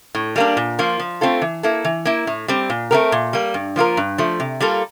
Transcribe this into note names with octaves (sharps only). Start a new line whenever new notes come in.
A2
G3 A#3 D4
A#2
F3 A#3 F4
F3
A3 C4 F4 A4
E3
A#3 E4 A4
E3
A#3 E4
A2
G3 C4
A#2
A3 C4 G4 A#4
A#2
G3 A#3
G2
F3 A#3 F4 A#4
G2
F3 A3
C3
G3 A#3 F4 A4